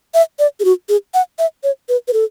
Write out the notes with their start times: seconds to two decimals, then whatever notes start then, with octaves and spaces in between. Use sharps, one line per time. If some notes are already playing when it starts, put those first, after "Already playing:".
0.14 E5
0.39 D5
0.60 G#4
0.65 F#4
0.89 G#4
1.14 F#5
1.39 E5
1.64 C#5
1.89 B4
2.08 B4
2.13 A4